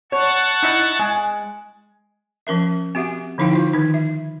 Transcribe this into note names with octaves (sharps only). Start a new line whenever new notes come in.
C#5 F#5 A5 C#6
D#4 E4 D#5
G#3
F3 C#4 A#4 E5
C4 F#4 G4 E5 F#5
D3 F3 D#4 E4 F5 G5
D#4 F4 C5
D#3 D#4
E5